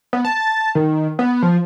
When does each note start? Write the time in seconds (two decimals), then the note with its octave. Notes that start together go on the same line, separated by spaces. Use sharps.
0.13 B3
0.25 A5
0.75 D#3
1.19 B3
1.42 F3